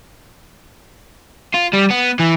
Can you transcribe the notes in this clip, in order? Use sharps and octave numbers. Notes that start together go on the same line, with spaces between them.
F4
G3
B3
E3